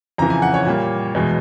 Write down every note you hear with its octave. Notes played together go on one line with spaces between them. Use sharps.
F2 C#3 E3 A#5
G#5
F#5
C#5
A#2 G3 A#3
E2 B2 G#3